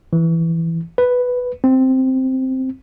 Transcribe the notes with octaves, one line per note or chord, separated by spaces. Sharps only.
E3
B4
C4